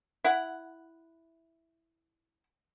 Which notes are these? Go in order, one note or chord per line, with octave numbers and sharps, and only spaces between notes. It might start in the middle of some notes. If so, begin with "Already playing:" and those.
E4 F#5